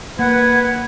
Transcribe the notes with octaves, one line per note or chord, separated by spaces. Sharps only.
A#3 B4 F#5 G#6